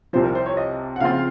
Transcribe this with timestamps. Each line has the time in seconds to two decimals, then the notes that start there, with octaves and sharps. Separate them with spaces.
0.13 C2 C3 F3 C5
0.24 A#4
0.35 C5
0.46 C#5
0.57 D#5
0.96 F#5
1.01 C#3 F3 C4 F4 F5